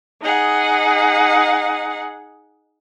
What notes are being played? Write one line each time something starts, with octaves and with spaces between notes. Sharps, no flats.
D#4 G#4 F#5